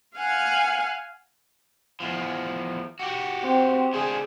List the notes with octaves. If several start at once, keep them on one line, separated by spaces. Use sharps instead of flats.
F5 F#5 G#5
E2 F3
F#4 G4
C4
D3 G#4 C5